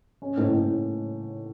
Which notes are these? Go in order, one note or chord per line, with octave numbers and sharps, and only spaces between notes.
C#4
A2
A2